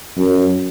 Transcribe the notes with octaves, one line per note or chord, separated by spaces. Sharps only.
F#2